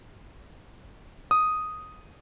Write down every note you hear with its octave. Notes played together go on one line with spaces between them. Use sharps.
D#6